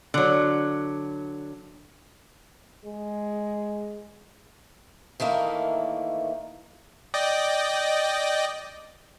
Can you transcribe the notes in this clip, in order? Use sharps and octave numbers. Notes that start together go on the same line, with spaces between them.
D3 F#3
G#3
D#3 E3 A3 A#3
D5 D#5 G5